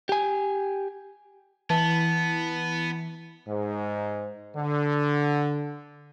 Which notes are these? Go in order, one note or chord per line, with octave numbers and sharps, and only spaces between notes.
G4 G#5
E3 B3 A5
G#2
D3